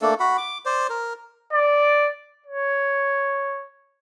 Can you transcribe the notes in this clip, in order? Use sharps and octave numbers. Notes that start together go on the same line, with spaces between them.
A3 A#3 D4 A4
F#4 F#5 B5
D6
C5 D5
A#4
D5
C#5